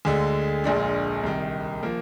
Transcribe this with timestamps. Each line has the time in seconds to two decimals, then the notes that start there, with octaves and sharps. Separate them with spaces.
0.05 D2 D3 G#3
0.64 A#1 A#2 G#3 D4
1.23 C2 C3 D#3
1.83 F3 A#3